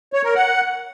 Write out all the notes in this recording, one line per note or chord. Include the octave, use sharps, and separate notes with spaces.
C#5
A#4
F#5